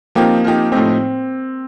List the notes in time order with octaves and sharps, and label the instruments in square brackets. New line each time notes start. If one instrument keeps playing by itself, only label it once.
[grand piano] F3 C4 D#4 G4 [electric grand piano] A#3
[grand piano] F3 C4 D#4 G4
[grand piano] A2 F3 A3 D#4 G4 [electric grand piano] C4